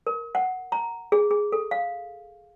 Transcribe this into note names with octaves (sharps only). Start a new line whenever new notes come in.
A#4
F#5
A#5
G#4
G#4
A4
F5